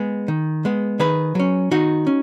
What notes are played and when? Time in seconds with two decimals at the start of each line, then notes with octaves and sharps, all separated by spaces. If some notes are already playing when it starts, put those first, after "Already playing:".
Already playing: G#3 B3 G#4
0.28 D#3
0.65 G#3 B3
0.99 D#3 G#4 B4
1.35 F#3 C#4
1.71 D#3 D#4 F#4
2.07 C#4